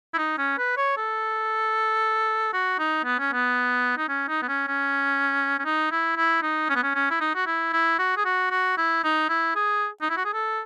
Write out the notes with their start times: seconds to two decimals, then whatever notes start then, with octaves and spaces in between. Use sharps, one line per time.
0.14 E4
0.18 D#4
0.38 C#4
0.58 B4
0.77 C#5
0.97 A4
2.53 F#4
2.79 D#4
3.05 B3
3.19 C#4
3.33 B3
3.97 D#4
4.09 C#4
4.28 D#4
4.42 B3
4.49 C#4
4.68 C#4
5.59 C#4
5.65 D#4
5.92 E4
6.17 E4
6.42 D#4
6.69 C#4
6.76 B3
6.83 C#4
6.95 C#4
7.11 E4
7.21 D#4
7.35 F#4
7.47 E4
7.73 E4
7.99 F#4
8.17 G#4
8.25 F#4
8.51 F#4
8.78 E4
9.04 D#4
9.29 E4
9.56 G#4
10.02 D#4
10.10 E4
10.17 F#4
10.25 G#4
10.34 A4